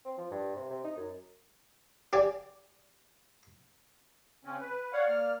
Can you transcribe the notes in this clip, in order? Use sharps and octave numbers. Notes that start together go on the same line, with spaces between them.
C4
F3
G2
C3
C3
D#4
F#2
G4 D5 G#5
C#3 C4 C#4
B4
C#5 D5 F5 F#5
A#3 F6